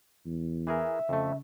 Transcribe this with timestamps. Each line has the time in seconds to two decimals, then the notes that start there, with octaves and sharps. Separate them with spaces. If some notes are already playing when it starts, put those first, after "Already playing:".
0.26 E2
0.67 E3 G#4 A#4 E5
1.09 F2 C#3 A3